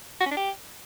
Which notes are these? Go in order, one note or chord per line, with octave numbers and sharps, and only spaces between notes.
F#4
C#4
D4
G4